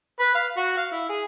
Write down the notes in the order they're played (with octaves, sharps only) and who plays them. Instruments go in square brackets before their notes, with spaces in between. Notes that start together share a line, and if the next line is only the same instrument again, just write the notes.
[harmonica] B4
F5
F#4
F5
E4
G#4